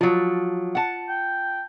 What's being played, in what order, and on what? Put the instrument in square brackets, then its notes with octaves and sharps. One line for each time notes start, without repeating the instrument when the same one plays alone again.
[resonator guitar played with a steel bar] F3 F#3 [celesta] F4
[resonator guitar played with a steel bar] F#5 A5
[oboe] G5